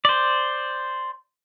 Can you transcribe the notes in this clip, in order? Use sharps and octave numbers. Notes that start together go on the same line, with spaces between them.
C5 D5